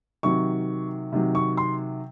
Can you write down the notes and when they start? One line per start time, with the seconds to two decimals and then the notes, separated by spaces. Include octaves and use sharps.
0.23 C3 D#3 F#3 C#6
1.12 C3 D#3 F#3
1.35 C#6
1.57 C6